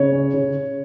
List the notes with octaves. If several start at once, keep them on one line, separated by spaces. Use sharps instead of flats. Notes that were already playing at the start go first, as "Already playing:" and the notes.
Already playing: C#3 C#5
C#4
C#3